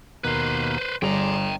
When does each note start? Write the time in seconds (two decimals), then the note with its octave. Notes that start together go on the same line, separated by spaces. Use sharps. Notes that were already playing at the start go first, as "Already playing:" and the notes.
0.24 D#2 B2 A#3 B4 C5
1.02 G1 G#4 D5 G5 A#5 C6